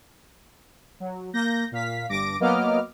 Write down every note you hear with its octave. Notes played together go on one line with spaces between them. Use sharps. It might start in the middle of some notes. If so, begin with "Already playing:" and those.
F#3
A#3 G6 A#6
A#2 F5 B6
G1 G2 D6 A#6 D7
F#3 A#3 B3 D#5 D6 F6